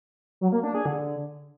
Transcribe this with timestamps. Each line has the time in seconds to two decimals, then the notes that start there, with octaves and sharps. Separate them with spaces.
0.41 F#3
0.52 A#3
0.63 D4
0.74 G#4
0.86 D3